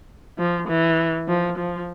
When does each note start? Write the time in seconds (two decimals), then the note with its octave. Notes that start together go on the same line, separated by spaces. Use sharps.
0.38 F3
0.68 E3
1.28 F3
1.58 F3